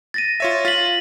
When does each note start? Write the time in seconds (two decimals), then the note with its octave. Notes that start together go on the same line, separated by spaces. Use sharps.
0.14 A6 A#6 D#7
0.40 F4 C#5 E5
0.65 F4 A6 B6 F#7